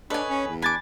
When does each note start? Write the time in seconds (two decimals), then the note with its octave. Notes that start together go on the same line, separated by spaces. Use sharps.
0.10 D4 D#4 A4 B4 C#5 G#5
0.29 C#4
0.47 E2
0.62 D4 G#5 B5 D6 G#6 A6